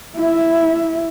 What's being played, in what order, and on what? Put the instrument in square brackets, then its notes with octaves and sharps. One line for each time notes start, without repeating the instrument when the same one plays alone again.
[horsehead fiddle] E4 E5